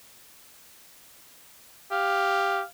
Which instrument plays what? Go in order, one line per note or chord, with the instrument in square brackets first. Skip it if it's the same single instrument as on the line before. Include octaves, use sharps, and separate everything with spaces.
[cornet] G4 [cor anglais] F5